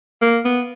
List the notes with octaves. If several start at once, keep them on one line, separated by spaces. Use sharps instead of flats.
A#3
B3